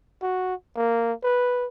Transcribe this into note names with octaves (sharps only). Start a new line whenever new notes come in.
F#4
A#3
B4